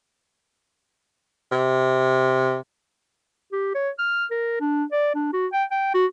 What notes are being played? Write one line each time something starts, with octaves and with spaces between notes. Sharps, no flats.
C3
G4
C#5
F6
A#4
D4
D5
D4
F#4
G5
G5
F#4